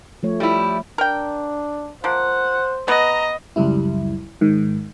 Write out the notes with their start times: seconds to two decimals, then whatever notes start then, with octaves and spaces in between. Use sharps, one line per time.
0.23 F3 A3 C#5
0.40 G3 E4
0.98 D4 A#4 G5
2.04 F3 A#3 C5 F#5
2.88 B3 B4 D#5 A#5
3.56 C#2 F#2 G3 E4
4.41 G#2 D#3